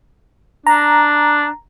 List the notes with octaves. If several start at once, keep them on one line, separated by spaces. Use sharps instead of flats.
D4 A#5